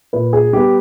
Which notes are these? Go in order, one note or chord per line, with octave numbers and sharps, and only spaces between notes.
A#2 B4
G#4
G3 B3 G4